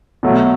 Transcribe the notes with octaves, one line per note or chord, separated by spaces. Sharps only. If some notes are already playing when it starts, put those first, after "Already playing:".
B2 F#3 A3